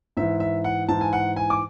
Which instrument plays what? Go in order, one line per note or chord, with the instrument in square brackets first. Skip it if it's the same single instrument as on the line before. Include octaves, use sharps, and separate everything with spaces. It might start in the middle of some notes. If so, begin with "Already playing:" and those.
[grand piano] G#2 E3 E5
E5
F#5
G#2 E3 A5
G#5
F#5
G#5
D6